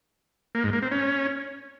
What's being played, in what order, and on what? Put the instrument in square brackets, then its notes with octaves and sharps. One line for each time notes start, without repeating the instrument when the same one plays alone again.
[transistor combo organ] A#3
G#2
A#3
C4
C#4